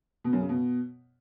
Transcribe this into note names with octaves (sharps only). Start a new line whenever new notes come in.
B2
F#2
C#3
B2